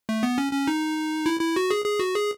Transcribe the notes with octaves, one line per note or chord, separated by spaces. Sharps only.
A3
B3
C#4
C#4
D#4
E4
E4
F#4
G#4
G#4
F#4
G#4